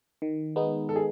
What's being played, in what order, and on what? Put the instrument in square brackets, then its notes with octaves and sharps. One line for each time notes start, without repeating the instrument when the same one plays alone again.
[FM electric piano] D#3
G#3 B3 D#4
[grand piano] A4
G#4